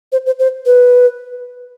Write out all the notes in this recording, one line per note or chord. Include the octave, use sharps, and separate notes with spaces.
C5
C5
C5
B4